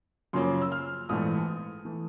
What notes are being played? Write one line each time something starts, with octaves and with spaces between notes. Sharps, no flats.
F#2 C#3 F3 A#3 C#4 C6
E6
F6
A#1 G#2 E3 A3 D#6
E3 A3